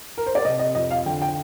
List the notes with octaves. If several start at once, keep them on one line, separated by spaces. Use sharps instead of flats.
A#4
C5
D5
C3 D#5
D#5
F2 D#5
F5
D3 G5
G5